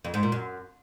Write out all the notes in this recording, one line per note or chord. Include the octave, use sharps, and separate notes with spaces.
F2
G#2
A#2
F#2